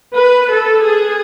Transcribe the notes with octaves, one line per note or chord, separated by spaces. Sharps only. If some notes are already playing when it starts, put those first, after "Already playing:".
B4
A4
G#4